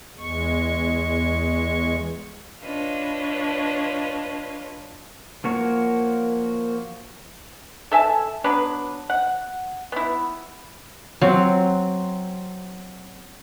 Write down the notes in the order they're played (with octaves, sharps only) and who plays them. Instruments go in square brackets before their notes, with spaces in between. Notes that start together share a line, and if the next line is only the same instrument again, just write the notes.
[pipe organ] E2 G#3 C#6
[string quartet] D4 F4 B4 C#5 D#5 A5
[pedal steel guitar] F3 A#3 F#4 A#4 C#5
[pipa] A4 E5 G#5 A5
F#3 B3 D4 B4
F#5
B3 E4
[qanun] F#3 C4